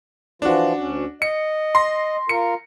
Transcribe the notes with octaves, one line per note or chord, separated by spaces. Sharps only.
E3 F3 D4 F4 F#4
D2 C#4
D#5 C#7
C6 A#6
F4 A#4 C#7